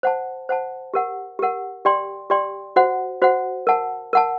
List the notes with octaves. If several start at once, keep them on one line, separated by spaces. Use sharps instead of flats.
C5 F#5 A5
C5 F#5 A5
G4 A#4 F#5
G4 A#4 F#5
G4 D5 G5 C6
G4 D5 G5 C6
F#4 C5 F#5
F#4 C5 F#5
A#4 F#5 A5
A#4 F#5 A5